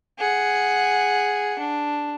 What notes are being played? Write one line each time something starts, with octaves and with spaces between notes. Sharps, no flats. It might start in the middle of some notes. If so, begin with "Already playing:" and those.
G#4 F#5
D4